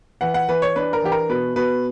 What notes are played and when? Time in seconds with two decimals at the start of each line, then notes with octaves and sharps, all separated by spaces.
0.21 E3 F#5
0.34 F#5
0.49 E3 B4
0.62 C#5
0.76 D4 B4
0.93 A#4
1.02 E3 G4
1.12 A#4
1.30 B2 B4
1.56 B2 B4